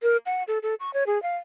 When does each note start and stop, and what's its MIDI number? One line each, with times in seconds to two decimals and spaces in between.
0.03 0.17 70
0.26 0.43 78
0.48 0.59 69
0.63 0.75 69
0.80 0.93 85
0.94 1.04 73
1.07 1.21 68
1.23 1.37 77